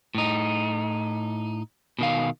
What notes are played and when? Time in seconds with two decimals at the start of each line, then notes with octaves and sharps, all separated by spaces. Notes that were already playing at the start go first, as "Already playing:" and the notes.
0.15 A2 D#4
1.99 B2 D#3 F5